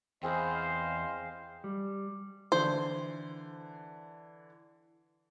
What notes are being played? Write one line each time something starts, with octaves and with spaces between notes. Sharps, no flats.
E2 C4 G#4 B4 C5 D#5 F5
G3
D3 E3 C5